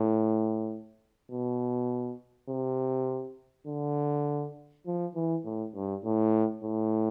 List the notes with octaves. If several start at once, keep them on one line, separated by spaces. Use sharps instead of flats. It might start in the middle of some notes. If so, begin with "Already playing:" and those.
Already playing: A2
B2
C3
D3
F3
E3
A2
G2
A2
A2